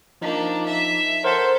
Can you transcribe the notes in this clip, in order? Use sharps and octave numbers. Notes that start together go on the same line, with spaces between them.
F3 A#3 D4 D#4
E5
A4 A#4 C5 C#5 F#5